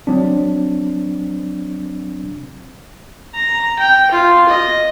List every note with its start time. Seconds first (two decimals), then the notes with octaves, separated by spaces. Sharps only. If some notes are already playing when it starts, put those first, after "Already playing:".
0.07 F#3 C4 D4
3.34 A#5
3.79 G5
4.11 F4
4.49 D#5